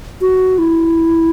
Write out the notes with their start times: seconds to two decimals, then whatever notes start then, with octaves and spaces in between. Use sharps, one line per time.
0.21 F#4
0.58 E4